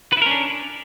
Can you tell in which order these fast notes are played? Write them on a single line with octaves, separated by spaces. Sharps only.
B4 E4 A#4 C#4 D4